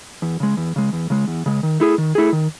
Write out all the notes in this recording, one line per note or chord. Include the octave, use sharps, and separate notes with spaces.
E2
C#3 G#3
E2
C#3 G#3
E2
C#3 G#3
E2
C#3 G#3
D#3
A3 E4 G#4
D#3
A3 E4 G#4
D#3